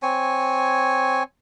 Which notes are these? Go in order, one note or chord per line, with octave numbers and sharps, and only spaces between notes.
C4 C#5 G#5